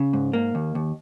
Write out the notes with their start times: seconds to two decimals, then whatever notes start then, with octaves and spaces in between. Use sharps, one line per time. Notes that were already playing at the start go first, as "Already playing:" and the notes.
Already playing: C#3
0.13 G#2
0.33 A#3
0.55 D#2
0.75 D#2